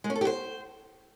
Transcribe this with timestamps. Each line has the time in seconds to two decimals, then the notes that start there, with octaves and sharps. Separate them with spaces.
0.04 G#3
0.10 C#4
0.15 A4
0.21 G4
0.27 C5